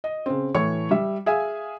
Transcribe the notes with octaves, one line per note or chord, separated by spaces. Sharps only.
D#5
C#3 C4
A2 E3 A4 C#5 C#6
G3 E5
G#4 E5 F5 G#5